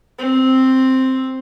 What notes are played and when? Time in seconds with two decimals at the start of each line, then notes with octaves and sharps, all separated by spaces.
0.19 C4